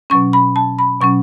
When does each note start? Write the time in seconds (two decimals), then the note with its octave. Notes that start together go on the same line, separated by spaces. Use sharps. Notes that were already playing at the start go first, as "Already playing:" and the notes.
0.10 B2 F#3 C#4 C#6
0.33 B5
0.56 A5
0.79 B5
1.01 B2 F#3 C#4 C#6